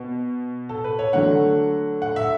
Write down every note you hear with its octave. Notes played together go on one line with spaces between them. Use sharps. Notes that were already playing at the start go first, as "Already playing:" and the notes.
Already playing: B2
A4
B4
C#5
D3 F#3 A3 F#5
F#5
E5